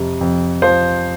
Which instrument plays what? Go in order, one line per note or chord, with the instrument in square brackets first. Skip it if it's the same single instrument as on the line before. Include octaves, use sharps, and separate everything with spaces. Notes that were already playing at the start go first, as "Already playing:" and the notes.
Already playing: [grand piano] F2 C3
F2
F3 C5